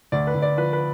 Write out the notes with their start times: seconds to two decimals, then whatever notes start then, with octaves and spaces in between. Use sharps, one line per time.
0.12 D2 D5
0.27 B4
0.35 D2
0.42 D5
0.57 F3 B4
0.73 B4